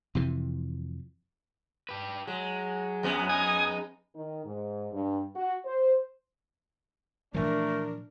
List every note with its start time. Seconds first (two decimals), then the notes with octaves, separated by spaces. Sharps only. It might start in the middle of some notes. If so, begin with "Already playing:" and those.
0.15 F2 C3 E3
1.89 G4 B4
2.27 F#3 G#3
3.03 F2 G#3 B3
3.29 D#4 G#5 D#6
4.15 D#3
4.45 G#2
4.92 G2
5.36 F#4
5.65 C5
7.34 A#2 E3 F3 A3 D4 A#4